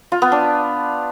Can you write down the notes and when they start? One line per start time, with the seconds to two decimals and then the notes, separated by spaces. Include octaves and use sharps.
0.12 F4
0.22 B3
0.32 D4